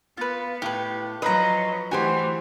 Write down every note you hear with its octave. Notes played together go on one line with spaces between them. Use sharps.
B3 F4 B4
A2 G4 B4
F3 F#3 B4 D#5 F5 A#5
E3 A3 F#4 G4 C5 G#5